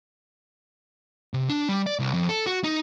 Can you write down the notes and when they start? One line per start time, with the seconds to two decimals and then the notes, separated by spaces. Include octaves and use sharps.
1.34 C3
1.49 D4
1.69 G3
1.86 D5
1.99 C2
2.14 F2
2.29 A4
2.46 F#4
2.64 D#4